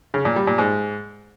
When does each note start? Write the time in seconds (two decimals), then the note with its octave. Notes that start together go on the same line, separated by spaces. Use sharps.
0.14 C#3
0.25 A#2
0.36 G3
0.47 A#2
0.58 G#2